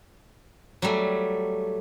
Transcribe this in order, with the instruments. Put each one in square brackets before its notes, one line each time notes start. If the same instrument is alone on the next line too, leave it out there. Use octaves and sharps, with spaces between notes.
[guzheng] F#3 G3 A3